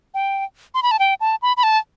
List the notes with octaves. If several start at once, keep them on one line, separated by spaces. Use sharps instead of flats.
G5
C6
B5
A5
G5
A5
B5
B5
A5